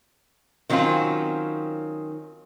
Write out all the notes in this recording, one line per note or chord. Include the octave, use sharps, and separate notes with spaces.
D#3 F#3 C4 C#4 F4